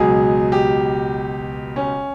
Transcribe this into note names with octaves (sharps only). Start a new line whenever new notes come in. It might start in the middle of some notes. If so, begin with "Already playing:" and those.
Already playing: C#2 B2 F#3 G#4
G4
C#4